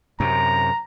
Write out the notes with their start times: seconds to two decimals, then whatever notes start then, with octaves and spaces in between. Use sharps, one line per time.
0.20 F#2 C3 A#5